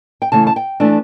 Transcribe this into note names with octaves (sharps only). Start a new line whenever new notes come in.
G5
C#3 E3 A3 A5
A5
G5
E3 A3 D4